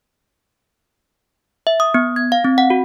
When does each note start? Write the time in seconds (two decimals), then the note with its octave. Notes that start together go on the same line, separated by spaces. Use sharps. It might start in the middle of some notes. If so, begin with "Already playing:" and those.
1.67 E5
1.80 D#6
1.94 B3
2.16 G#6
2.32 F5
2.44 C4
2.58 F#5
2.70 F#4